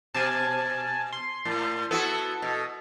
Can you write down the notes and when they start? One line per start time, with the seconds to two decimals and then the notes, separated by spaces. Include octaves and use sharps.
0.14 B2 G#5 A5
1.12 C6
1.45 A2
1.91 B3 E4 F#4 A4
2.42 B2